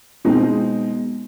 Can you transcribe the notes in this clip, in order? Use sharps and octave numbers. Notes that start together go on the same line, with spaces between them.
B2 G#3 C4 D#4